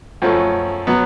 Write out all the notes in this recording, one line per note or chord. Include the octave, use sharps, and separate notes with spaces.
F#2 F3 A3 C#4
F#3 B3